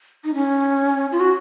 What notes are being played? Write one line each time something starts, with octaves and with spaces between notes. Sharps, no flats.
D#4
C#4
F4
F#4